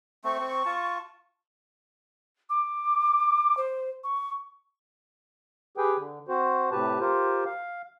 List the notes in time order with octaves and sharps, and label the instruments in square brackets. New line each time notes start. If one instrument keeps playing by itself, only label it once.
[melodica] A3 C4 [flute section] C#6
[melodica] C4
F4 A5
[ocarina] D6
C5
C#6
[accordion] G4 G#4 B4 G5
D3
C4 F#4 C5
A2 C3 G4 B4 A5
F4 G4 A#4 C5
F5